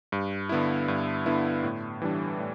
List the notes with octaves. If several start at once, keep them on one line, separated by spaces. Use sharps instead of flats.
G2
D3 B3 E4
G2
D3 B3 E4
A2
E3 G3 D4
A2